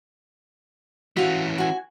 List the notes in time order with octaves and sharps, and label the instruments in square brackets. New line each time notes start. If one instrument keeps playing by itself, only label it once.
[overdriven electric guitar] E3 C#4 [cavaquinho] F#4 F5
[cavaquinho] F#4 G#5